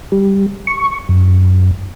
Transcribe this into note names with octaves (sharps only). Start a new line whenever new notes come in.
G3
C#6
F#2